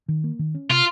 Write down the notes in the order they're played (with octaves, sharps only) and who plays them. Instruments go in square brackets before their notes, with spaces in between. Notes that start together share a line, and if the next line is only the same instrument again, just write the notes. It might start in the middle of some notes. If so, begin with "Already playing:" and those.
[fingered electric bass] D#3
A#3
D#3
C#4
[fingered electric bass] C3 [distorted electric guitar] F4